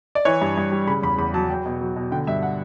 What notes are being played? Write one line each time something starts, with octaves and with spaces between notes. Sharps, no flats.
D5
E3 C#5
G2
G2
G3
C#3 B5
E2 B5
E2 B5
F#3 A5
F#3 G5
B2
F#3
B2
D3 G5
G2 E5
F#5